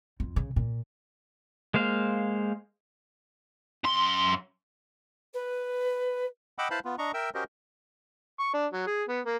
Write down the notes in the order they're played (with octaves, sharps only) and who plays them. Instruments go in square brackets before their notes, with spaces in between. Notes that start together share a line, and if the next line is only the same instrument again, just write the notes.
[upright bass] F2
C#3
A#2
[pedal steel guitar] G#3 A#3 C5 F5
[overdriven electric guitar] F#2 C6
[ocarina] B4
[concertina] D#5 F#5 G5 B5 D6 E6
E4 B4 C5 F5 A5 B5
B3 F4
D4 D#5 A#5 C#6
A#4 E5 G5 E6
C#4 F#4 G4 A#4 C5 D#5
[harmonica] C#6
D4
F#3
G#4
B3
A#3